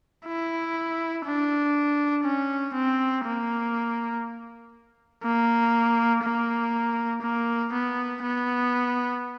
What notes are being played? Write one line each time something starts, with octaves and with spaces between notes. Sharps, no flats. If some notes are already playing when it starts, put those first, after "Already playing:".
E4
D4
C#4
C4
A#3
A#3
A#3
A#3
B3
B3